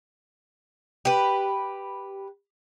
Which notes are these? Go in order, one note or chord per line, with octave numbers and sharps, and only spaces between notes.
G4 B4